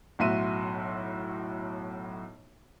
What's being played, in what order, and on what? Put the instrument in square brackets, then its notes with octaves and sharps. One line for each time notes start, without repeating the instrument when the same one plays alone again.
[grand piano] B1 A2 F#4 E5 C6 D#7